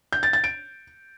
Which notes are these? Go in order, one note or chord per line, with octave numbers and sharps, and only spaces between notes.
G6
A6
A6
D7